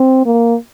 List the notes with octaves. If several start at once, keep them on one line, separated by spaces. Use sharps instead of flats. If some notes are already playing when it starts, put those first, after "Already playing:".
Already playing: C4
A#3